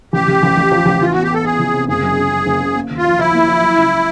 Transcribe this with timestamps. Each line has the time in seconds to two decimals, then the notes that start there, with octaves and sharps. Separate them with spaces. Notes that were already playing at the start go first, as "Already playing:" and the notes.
0.13 A1 G4
0.28 A1
0.43 A1
0.57 A1
0.71 F3
0.86 A1
1.01 E3 F4
1.12 B3 F#4
1.23 G4
1.30 B3 A4
1.44 B3 G#4
1.59 E3
1.73 C3
1.88 F#1 G#4
2.02 F#2
2.17 C#3
2.31 F#2
2.46 F#1
2.61 C#3
2.75 A#3
2.90 D#2
2.97 F4
3.04 F3
3.19 F3 E4
3.34 A#3
3.48 F3
3.62 F#3
3.78 C#2